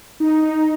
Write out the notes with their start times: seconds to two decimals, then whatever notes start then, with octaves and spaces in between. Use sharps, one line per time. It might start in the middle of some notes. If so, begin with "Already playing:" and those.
0.20 D#4
0.42 D#4